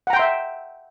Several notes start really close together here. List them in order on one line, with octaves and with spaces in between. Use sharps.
F#5 A#5 G5 C6 E5